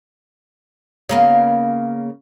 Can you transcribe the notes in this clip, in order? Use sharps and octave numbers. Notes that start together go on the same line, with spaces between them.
C#3 A#3 B3